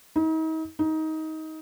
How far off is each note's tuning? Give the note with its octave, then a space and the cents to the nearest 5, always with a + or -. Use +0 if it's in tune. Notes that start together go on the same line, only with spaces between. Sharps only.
D#4 +40
D#4 +20